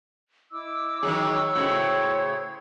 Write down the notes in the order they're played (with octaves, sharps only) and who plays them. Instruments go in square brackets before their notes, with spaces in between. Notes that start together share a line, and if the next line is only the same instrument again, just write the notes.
[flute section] E4 D#5 D6 [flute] E6
[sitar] D#3 F#3 G#4 [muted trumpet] C#5
[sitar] A2 C#3 F#4 [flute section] G#4 C5 G#6